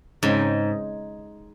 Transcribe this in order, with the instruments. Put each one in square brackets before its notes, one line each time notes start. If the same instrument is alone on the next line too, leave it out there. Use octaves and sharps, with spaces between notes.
[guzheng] G#2 [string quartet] C#3 G#3 C4 D#4